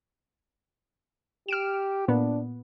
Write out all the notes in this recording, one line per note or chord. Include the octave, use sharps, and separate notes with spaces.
G4 F6 D7 E7
A#2 B3 D4